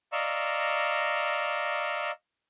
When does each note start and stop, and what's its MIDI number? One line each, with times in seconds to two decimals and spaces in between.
0.13 2.11 74
0.13 2.11 75
0.13 2.11 77
0.13 2.11 82
0.13 2.11 85
0.13 2.11 88